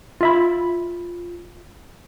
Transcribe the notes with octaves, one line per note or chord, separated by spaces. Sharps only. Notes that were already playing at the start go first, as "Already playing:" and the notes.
F4 E5 B5